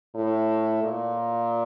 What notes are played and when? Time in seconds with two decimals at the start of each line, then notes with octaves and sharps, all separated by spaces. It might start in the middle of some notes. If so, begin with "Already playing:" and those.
0.15 A2
0.84 A#2